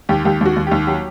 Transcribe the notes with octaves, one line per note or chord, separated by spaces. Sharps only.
D#2 G4
D#2 G4
D#2 F#4
D#2
D#2 G4
F#3 G4